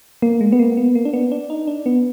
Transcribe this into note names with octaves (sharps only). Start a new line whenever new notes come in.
A#3
G#3
B3
A#3
B3
A#3
D4
B3
D4
D#4
D4
B3